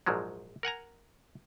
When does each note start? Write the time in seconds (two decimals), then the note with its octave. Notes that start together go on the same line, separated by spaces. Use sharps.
0.06 A#1 G#2 F3 F#3 G#3
0.63 A#4 F#5 G#5 A#5